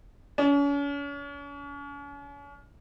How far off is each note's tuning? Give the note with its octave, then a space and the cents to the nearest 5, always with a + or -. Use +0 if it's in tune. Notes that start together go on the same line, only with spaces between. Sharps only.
C#4 +40